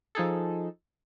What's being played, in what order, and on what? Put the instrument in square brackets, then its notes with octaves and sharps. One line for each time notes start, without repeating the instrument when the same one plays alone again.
[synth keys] F3 D#4 G#4 A4